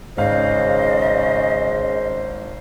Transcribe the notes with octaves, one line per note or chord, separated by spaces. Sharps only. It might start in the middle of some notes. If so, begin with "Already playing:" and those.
G#1 C#3 C5 D#5 F5